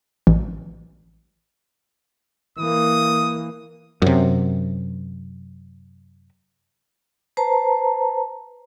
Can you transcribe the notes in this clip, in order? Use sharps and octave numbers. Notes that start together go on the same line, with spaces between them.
A1
E3 A#3 D#6
F#2 C3
B4 C5 A5 A#5